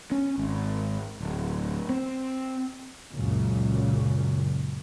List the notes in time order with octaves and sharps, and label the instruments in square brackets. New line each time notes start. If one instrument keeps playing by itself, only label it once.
[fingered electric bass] C#4
G#1
D1
C4
[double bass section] C#2 F#2 A#2 C#3